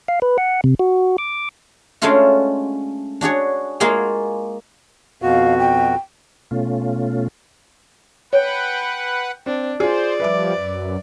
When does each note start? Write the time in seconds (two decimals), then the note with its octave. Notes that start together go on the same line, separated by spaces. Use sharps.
0.08 F5
0.22 B4
0.38 F#5
0.64 C3
0.79 F#4
1.18 D6
2.02 G#3 A3 C#4 D4 F4 F#4
3.21 D4 F#4 G#4 C#5
3.80 G#3 A#3 F4 F#4 G#4
5.22 F2 B2 F#4 F5
5.59 G5
6.51 B2 A3 C#4 F4
8.33 B4 C#5 F#5 G5
9.46 C4 D4
9.80 F4 G#4 C5 D5
10.20 F3 G3 B4 E5 D6
10.55 F#2